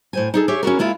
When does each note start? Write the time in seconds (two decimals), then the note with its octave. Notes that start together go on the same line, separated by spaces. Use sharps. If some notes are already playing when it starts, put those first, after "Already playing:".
0.13 A2 C5 G#5
0.34 D#4 G#4 A4
0.48 G4 G#4 C#5 E5
0.63 C#4 E4 F#4 A#4
0.79 G#3 A#3 E4 F4